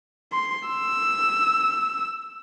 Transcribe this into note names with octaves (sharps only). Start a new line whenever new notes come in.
C6
E6